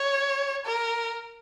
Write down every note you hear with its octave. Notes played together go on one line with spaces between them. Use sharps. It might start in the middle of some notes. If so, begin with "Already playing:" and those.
Already playing: C#5
A#4